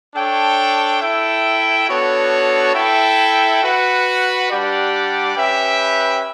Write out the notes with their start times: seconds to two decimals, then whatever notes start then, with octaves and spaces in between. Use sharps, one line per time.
0.14 D4 A4 C#5 G5
1.01 E4 A4 E5 G5
1.88 B3 D4 F#4 A4 C#5
2.75 E4 A4 E5 G5
3.62 F#4 B4 F#5
4.50 G3 D4 G4 D5 F#5
5.36 C#4 G4 B4 E5 G5